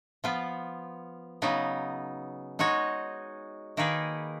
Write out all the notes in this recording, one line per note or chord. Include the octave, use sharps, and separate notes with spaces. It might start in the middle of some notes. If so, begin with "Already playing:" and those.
F3 B3 F4
C#3 F#3 B3 D#4
G#3 D#4 F#4 C#5
D#3 A#3 D#4 G#4 B4